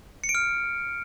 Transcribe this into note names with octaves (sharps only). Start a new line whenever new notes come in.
C#7
D7
F6